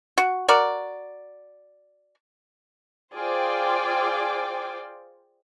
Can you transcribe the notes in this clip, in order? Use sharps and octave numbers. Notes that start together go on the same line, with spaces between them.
F#4
F#4 A#4 D5
F4 G#4 C5 D5 G5 D6